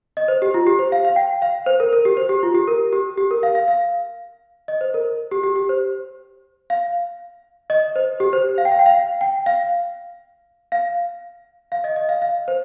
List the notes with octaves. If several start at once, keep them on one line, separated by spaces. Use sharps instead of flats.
D#5
C5
G4
F4
G4
C5
F5
F5
G5
F5
C5
A#4
A#4
G4
C5
G4
F4
G4
A#4
G4
G4
A#4
F5
F5
F5
D#5
C5
A#4
G4
G4
G4
C5
F5
D#5
C5
G4
C5
F5
G5
F5
G5
F5
G5
F5
F5
F5
D#5
D#5
F5
F5
C5